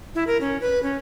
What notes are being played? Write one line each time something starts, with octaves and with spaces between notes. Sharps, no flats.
E4
A#4
C#4
B4
C#4